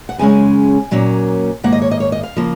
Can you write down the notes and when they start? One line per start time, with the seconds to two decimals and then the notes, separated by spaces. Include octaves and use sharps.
0.09 F#5
0.18 F#2 C#3 G#3 C#4 G#5
0.91 A#2 F#3 A#3 C#4
1.63 G#2 D#3 A#3 F#5
1.72 D#5
1.82 C#5
1.91 D#5
2.00 C#5
2.12 D#5
2.23 F5
2.37 C#3 F3 A#3 F4